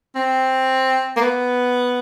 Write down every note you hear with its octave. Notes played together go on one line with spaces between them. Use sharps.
C4
A#3
B3